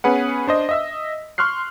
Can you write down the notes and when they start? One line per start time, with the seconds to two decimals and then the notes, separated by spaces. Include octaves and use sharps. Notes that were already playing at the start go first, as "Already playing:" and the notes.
0.04 B3 C#4 G#4 B4 F#5
0.47 D4 C5 D#5
0.69 D#5 E5 E6
1.38 C6 C#6 F6 F#6 C7